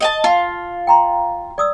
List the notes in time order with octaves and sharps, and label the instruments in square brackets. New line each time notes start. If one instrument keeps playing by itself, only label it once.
[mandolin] D#5 G#5 A5
[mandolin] F4 [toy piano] A5
[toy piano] G5 A#5 C6
D5 D#6 E6